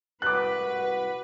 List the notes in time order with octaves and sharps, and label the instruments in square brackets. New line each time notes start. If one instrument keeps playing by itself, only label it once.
[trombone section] C2 F#4 [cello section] B4 [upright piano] D6 F#6